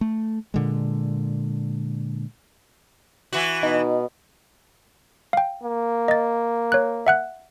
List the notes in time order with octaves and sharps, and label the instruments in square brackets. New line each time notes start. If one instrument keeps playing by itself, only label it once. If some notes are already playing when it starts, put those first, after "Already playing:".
[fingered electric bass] A3
A#2 D3 G#3
[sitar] E3 F#4
[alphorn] B2 [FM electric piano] D#4
[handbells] F5 G5
[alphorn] A#3
[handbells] D#5 A6
C#5 F#6
E5 F#5 F#6